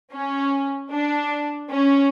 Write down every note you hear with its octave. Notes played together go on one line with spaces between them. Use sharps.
C#4
D4
C#4